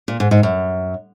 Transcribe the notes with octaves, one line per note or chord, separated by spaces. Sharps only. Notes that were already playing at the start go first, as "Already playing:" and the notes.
A#2
G#2
G#2
F#2